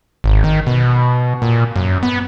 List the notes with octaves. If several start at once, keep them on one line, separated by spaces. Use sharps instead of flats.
G#1
D#3
B2
A#2
F#2
B3